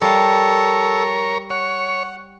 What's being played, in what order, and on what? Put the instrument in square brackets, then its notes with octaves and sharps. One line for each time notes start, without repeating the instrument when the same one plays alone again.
[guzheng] G3 F5 [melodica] A4 [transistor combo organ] A#4 C#5
[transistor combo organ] C#5 [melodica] F#5